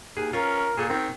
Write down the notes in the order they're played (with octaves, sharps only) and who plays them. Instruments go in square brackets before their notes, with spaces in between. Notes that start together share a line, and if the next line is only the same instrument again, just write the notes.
[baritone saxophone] D#2 [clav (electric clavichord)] G#4
[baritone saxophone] C#4 [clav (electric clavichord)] F4 [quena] A#4
[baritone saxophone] A#2 [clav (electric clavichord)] G#4 A4
[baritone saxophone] D#3 [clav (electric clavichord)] C4